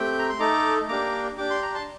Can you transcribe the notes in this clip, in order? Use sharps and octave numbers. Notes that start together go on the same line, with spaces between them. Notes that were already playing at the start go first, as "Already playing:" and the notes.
Already playing: A3 C4 G4 G5
A#5
C6
A3 D#4 A4 A#5 D6
A#3 D4 G4 A#5 D6
D4 G4 D6
C6
A#5
A5 C6